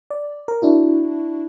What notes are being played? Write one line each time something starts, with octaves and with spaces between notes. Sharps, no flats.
D5
A#4
D4 E4 F#4